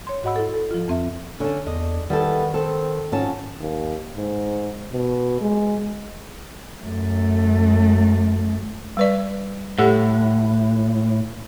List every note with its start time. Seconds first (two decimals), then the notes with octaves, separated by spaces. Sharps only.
0.07 C#5 C6
0.23 G#2 F#4 D#5 F#5 B5 E6
0.36 E4 A4
0.54 A4
0.71 F3 F4
0.88 F2 C4 E5
1.40 D3 C#4 D4
1.67 E2 D4 D#5
2.10 D#3 G3 B3 E4 A4
2.54 C4 A4
3.12 F2 G#2 F#3 C#4 A5
3.59 D#2
4.17 G#2
4.92 B2
5.41 G#3
6.84 F#2 A3
8.97 G3 B4 D5
9.78 A2 G4 A4 F#5